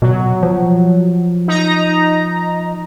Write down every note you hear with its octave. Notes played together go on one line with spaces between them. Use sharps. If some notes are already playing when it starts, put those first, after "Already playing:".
B2 F#3
F3
D#4 A#5